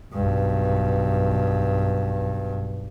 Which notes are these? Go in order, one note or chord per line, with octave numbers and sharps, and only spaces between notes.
B1 G2